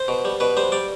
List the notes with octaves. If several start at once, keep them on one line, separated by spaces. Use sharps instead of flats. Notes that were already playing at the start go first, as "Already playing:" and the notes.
Already playing: C5
B2
G3
B2 B4
G3 C5
G3 D5